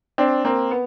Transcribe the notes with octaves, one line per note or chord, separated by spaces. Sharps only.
C4 D4
A#3 C4
B3